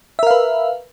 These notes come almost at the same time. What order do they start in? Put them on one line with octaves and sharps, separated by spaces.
E5 A#4 F5 B4